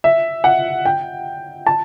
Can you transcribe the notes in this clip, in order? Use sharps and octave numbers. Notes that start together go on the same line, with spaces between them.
E5
F#5
G5
A5